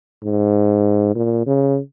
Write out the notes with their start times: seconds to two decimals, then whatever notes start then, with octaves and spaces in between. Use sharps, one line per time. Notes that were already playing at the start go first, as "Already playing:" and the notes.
0.24 G#2
1.15 A#2
1.46 C#3